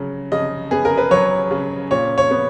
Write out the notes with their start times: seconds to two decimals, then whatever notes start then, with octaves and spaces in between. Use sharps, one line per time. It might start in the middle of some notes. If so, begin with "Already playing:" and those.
Already playing: C#3 F#3
0.32 C#3 D#5
0.71 B3 G#4
0.85 A#4
0.97 B4
1.11 F#3 C#5
1.51 C#3
1.91 A#2 C#5
2.18 C#5
2.31 B3